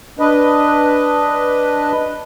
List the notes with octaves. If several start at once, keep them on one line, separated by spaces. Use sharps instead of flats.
D4 B4 D#5